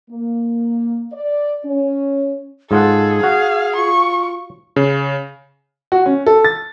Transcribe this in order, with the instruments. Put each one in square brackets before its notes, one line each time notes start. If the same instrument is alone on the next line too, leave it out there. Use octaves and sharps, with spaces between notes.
[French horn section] A#3
D5
C#4
[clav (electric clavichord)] G#2 F4 F#5 [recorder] G#4 [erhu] A4
[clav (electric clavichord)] F#4 F#5 [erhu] F5
[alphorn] F4 [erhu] C#6
[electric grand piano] C#3
[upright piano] F#4
C#4
A4
A6